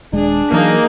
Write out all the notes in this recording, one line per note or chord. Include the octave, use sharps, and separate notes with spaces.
D#1 G#3 D4 G#4
E3 F#3 A#3 D#4 G#4 D#5